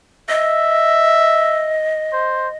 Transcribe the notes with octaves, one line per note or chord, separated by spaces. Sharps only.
D#5 E5
C5